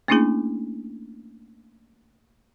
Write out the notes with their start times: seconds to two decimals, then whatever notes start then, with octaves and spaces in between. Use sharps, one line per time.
0.08 A3 A#3 C#4 D4 E4 G#4